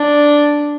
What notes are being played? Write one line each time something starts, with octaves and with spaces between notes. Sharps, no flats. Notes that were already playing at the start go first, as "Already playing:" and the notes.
Already playing: D4